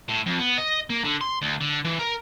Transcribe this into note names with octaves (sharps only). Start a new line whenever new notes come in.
A2
F2
B3
D#5
A#3
D3
C6
D2
D3
E3
A#4